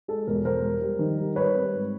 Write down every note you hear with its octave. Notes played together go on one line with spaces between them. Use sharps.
G#3 A4
E1 A#4
E1 A#4 C5
G3
G3
D#3
G3
G3 B4 C#5
C4
G#2